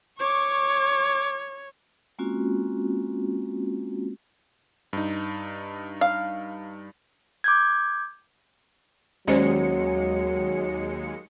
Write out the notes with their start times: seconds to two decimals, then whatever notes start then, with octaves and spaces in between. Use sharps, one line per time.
0.20 C#5 C#6 D6
2.19 G#3 A#3 C4 C#4 F4 F#4
4.93 G2 D#4
6.01 F5
7.44 D6 G6 G#6
9.28 D#2 F#3 G#3 C#4 C5 D5 C#7